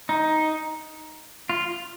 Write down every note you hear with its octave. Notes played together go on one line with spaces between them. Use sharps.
D#4
F4